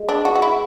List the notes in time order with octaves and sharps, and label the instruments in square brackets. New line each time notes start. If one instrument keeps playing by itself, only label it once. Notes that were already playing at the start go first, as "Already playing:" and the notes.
Already playing: [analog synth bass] G#3
[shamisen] D4
F#4
F#4
E4